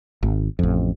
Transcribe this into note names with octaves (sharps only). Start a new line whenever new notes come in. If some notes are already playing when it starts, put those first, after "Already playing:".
G#1
A1 F2